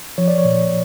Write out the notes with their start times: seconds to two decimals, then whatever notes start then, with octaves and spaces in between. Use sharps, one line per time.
0.18 F3 C#5
0.28 D5
0.38 C#5
0.45 A#2